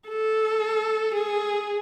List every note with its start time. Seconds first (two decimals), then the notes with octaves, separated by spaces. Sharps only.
0.09 A4
1.14 G#4